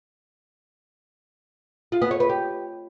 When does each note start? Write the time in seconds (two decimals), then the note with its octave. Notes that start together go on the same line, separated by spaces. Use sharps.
1.92 F4
2.02 B3
2.11 C#5
2.20 B4
2.29 G4